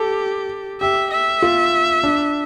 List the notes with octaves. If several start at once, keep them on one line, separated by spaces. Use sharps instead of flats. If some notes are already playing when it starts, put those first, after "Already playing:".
Already playing: G4 A4
G4 E5
E5
F4
D4